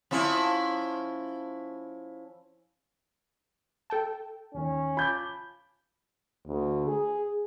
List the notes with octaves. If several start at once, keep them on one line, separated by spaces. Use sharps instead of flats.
F3 C#4 E4
A4 G5 A5
D#2 D#3 C#4
F4 A5 B5 D6 G6
D2
G#4